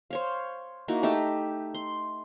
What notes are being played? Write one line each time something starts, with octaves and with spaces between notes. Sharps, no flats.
C5 C#5 F5
A#3 D#4 E4 F#4
A3 D#4 G4 E5
C6